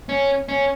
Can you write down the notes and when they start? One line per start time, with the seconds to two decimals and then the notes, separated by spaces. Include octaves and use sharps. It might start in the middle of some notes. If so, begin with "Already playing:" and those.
0.09 C#4
0.49 C#4